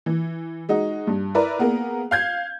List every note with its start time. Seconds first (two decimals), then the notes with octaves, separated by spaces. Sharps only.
0.06 E3
0.69 G#3 D#4 F#4
1.07 G2
1.35 E4 A#4 B4 D5 A#5
1.59 A#3 B3 G#4 A#4
2.11 F5 G6 G#6